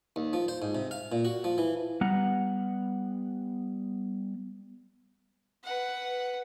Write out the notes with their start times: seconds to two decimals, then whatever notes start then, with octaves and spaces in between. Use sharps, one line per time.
0.16 D#2
0.33 F3
0.48 C5
0.62 G#2
0.75 C3
0.91 F5
1.12 A#2
1.25 F#4
1.44 F3
1.58 E3
2.01 G3 B3 F#5 A#5
5.64 B4 F#5